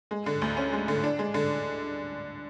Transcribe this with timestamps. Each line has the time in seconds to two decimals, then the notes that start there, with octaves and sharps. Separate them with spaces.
0.11 G#3
0.26 D3
0.42 D2
0.57 C#4
0.73 G#3
0.88 D3
1.04 D4
1.19 G#3
1.34 D3